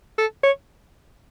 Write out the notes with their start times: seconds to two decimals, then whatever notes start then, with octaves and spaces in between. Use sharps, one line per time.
0.18 A4
0.43 C#5